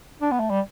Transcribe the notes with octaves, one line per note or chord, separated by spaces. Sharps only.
D4
B3
A3
G3